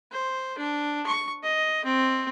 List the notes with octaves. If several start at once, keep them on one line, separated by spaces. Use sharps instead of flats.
C5
D4
C#6
D#5
C4